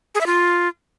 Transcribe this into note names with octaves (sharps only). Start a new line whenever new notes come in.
G#4
E5
F4